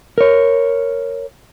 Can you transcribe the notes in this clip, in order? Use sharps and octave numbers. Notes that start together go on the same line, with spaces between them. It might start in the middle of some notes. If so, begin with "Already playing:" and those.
A#4 C#5